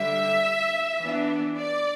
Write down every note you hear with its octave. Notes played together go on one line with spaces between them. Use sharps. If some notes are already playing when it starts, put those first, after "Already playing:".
Already playing: D3 G3 D4 E5
E3 B3 D4
D5